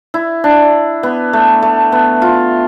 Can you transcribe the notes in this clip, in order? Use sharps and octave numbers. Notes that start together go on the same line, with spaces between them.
E4
D4
B3
A3
A3
B3
F4